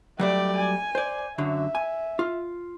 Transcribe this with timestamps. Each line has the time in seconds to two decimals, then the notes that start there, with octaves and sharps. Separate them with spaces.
0.19 F#3 G3 A3 D5 G5
0.57 G#5
0.95 C5 D5
1.38 F#2 D3 F#3 E5
1.75 G#5
2.19 F4